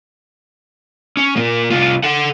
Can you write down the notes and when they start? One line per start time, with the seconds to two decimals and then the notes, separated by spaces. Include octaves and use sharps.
1.17 C#4
1.36 A#2 A#3
1.71 C2 F4
2.03 A4 F#5